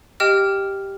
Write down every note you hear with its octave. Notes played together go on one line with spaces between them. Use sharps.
G4 D#5 G5 F6